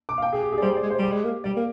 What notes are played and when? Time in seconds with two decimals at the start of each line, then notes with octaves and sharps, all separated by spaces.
0.09 D6
0.18 F5
0.22 G5
0.33 G#4
0.43 G4
0.53 G#4
0.58 D5
0.62 G3 C5
0.77 D5
0.83 G#3
0.90 C5
0.98 G3 G4
1.12 G#3
1.24 A#3
1.44 G3 D5
1.57 A#3